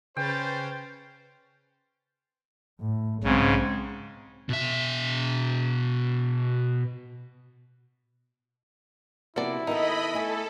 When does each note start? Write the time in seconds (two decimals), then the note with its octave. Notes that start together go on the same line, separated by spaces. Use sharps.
0.17 C#3 C#4 B4 C5 G5 A6
2.81 A2
3.24 B1 G#2 C#3 C4
4.49 B2 E5
9.36 C3 F3 A#3 E4 F#4 D5
9.67 D#3 B3 D#4 A4 D#5 B5
10.14 A3 A4 G#5